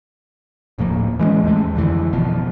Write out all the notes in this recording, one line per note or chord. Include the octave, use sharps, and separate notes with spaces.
D1 A2 F3 A#3
E3 G#3 A#3 C#4
D#2 G#3 A3
F2 D3 E3
G#1 B2 F3